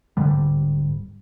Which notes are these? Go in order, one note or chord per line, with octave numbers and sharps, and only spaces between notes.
D1 G#2 D3 G3